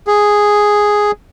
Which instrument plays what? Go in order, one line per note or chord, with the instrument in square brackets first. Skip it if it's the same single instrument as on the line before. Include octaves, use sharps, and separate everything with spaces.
[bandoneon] G#4